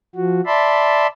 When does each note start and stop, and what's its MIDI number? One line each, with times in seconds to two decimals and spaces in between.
0.15 0.41 53
0.15 0.41 66
0.46 1.07 74
0.46 1.07 76
0.46 1.07 81
0.46 1.07 83
0.46 1.07 84